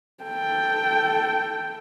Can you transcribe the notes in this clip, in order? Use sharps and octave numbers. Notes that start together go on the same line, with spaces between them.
A4 G5